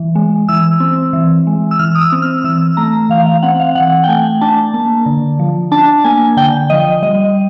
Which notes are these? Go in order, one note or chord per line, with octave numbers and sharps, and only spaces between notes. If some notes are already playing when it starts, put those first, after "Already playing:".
Already playing: E3
G#3
E3 E6
C4
E3
G#3
E6
E3 F6
D#6
E6
C4
F6
E3 E6
A3 A#5
E3 F5
F5
C4 F#5
F5
E3 F#5
G5
A3 G#5
D4 A5
A#3
D3
F3
D4 A5
A#3 G#5
D3 G5
F3 D#5
G3 D#5